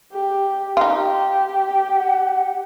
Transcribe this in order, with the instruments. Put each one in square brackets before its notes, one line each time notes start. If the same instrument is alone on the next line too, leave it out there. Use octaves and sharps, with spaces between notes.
[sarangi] G4
[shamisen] D#4 F4 [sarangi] G4
[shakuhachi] F#5